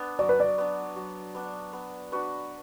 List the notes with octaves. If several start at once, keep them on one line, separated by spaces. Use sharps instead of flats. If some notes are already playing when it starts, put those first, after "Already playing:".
Already playing: B3 D4
F#3 D5
B4
D5
B3 D4
F#3
B3 D4
B3
D4 F#4 B4